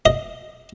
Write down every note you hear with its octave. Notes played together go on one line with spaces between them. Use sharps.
D#5